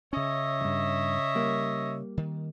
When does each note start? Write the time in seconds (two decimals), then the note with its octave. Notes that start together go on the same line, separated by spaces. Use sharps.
0.13 C#3 C#4 C#5 D#5 E5
0.61 E2 G2
1.35 G3 A#3
2.17 D#3